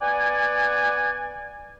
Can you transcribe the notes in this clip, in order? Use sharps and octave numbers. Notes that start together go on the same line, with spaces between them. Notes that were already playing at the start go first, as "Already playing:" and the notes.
B3 D5 F#5 G#5